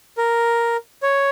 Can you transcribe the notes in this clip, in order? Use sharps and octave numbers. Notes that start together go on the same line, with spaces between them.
A#4
C#5